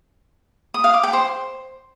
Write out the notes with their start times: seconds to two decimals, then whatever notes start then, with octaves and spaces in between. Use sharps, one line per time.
0.74 D#6
0.84 F5
0.94 D6
1.03 G5
1.13 C5